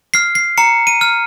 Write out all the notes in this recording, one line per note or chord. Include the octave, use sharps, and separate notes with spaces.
F6 C7
C7
A#5 C#7
D#7
F6